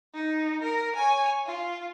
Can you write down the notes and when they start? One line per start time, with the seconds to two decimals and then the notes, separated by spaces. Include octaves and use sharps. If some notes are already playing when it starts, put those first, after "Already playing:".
0.14 D#4
0.62 A#4
0.96 C#5 G#5
1.46 F4